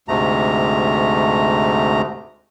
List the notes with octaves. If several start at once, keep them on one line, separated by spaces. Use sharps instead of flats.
D2 G#2 C3 A3 A#5